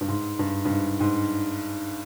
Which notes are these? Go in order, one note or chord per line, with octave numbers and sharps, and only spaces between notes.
G2
G#2
G2
G2
G#2
G#2